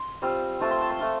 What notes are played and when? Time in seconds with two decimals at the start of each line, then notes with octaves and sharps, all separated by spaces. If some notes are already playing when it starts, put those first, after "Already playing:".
Already playing: C6
0.22 G3 C4 F4
0.60 F3 A3 C4 F4 A5
0.71 C6
0.81 A5
0.90 C6
1.00 A3 F4